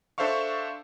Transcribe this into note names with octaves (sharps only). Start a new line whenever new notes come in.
D4 A4 C5 E5 F5 C#6